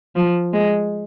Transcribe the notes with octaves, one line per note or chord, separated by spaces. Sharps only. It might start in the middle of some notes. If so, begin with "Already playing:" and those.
F3
G#3